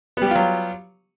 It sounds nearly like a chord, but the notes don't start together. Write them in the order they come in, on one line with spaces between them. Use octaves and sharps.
B3 G3 G4 F4 F#3